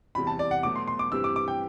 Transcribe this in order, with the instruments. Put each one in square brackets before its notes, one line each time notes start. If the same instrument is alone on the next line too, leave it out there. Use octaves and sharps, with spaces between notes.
[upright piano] E2 C3 G3 [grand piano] B5
[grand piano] A5
D5
F#5
[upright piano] B2 F#3 A3 [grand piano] D6
[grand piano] C6
C6
D6
[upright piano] G2 E3 G3 C4 G4 [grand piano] E6
[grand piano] D6
D6
G5